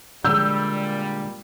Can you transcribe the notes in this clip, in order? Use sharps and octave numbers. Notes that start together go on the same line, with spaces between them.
A#2 D3 G3 G#3 E6 G6